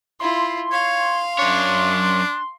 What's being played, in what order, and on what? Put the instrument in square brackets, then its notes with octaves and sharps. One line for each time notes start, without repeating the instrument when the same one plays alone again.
[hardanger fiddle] E4 F4 [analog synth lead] C6
[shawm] C#5 [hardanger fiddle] F5
[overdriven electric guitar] F#2 C#5 [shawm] D4